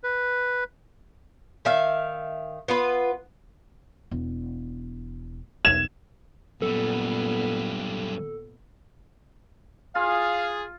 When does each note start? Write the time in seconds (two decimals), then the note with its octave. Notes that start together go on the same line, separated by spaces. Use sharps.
0.04 B4
1.65 D#3 E5 F5
2.68 B3 F4 B4
4.11 E1
5.65 B1 E2 G#6 E7
6.62 F#2 A#2 G3 B3 A4
9.95 F4 G#4 F5